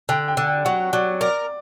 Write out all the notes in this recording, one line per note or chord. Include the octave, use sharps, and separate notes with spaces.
D3 G5
G5
D3
G5
F#3 F#5
F#3 D5
A#4 D5